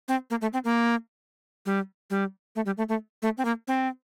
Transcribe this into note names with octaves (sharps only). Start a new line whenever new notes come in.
C4
A#3
A3
C4
A#3
G3
G3
A3
G3
A3
A3
A3
C4
A#3
C4